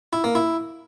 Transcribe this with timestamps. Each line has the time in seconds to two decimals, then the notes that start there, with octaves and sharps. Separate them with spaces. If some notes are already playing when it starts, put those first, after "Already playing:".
0.13 E4
0.24 A#3
0.35 E4